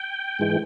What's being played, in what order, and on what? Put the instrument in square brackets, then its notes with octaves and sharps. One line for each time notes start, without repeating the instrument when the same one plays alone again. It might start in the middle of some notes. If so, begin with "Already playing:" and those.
Already playing: [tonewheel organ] G5
G#2 E3 G#3